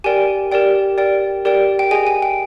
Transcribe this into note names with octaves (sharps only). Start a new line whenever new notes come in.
G4 A#4 D5 G5 G#5
G4 A#4 D5 G5
G4 A#4 D5 G5
G4 A#4 D5 G5
G5
G#4 D#5 G5 G#5
G#5
G5